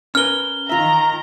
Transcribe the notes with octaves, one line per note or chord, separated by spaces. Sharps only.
C#4 A#4 B4 F6 G7
D#3 F4 E5 A#5